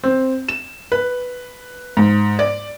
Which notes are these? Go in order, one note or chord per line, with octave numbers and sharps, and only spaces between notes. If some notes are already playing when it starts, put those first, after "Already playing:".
C4
E7
B4
G#2
D5